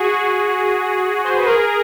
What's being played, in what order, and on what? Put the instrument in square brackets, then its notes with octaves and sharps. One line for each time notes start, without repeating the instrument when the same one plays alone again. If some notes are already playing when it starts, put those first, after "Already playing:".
Already playing: [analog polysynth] F#4 G#4
C5
B4
G#4 A#4